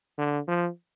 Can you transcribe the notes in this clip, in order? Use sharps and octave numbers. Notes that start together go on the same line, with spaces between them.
D3
F3